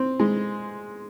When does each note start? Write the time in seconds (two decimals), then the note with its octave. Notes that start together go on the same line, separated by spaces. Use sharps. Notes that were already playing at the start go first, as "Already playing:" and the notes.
Already playing: C4
0.20 G#3